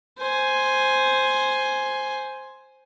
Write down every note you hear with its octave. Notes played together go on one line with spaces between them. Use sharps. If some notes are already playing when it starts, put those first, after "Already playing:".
C5 G#5